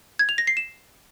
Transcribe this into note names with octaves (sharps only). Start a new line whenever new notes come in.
G#6
F7
A#6
C7
E7